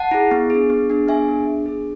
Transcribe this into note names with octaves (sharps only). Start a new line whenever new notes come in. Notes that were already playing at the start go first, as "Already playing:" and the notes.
Already playing: F#5 A5
E4 G#4
B3
D4 G#4
B3
D4 G#4
B3 E5 G#5
D4 G#4
B3
D4 G#4